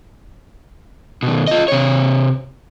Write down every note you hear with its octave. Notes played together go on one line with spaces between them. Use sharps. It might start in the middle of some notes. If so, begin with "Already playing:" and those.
B2 D#3
F4 D#5
C3 C#5